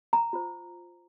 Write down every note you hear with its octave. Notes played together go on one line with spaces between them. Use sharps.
A#5
F4 C5